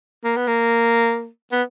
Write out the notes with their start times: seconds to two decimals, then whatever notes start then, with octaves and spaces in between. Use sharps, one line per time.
0.24 A#3
0.36 B3
0.48 A#3
1.52 B3